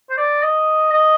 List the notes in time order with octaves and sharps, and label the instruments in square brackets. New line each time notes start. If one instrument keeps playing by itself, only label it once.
[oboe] C5
D5
D#5
D#5